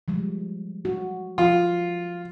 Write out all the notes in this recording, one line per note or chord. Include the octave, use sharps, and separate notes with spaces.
F3 G3 G#3
F#4
F3 F4